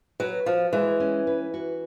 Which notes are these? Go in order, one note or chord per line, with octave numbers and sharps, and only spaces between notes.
F#3 B4
F3 F#4
E3 G#3
C#4
B4
F#4